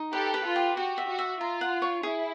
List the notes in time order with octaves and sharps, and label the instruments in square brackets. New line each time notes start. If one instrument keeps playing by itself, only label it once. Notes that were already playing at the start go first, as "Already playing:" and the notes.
Already playing: [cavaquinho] D#4
[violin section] G4 A4 [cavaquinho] B4
[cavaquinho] B4
[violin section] F4
[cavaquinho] G4
[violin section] F#4 [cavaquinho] G4
[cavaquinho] E5
[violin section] F#4
[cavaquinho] E5
[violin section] F4 [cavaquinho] A#5
[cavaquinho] F#5
C#5
[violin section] E4 [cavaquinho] G#4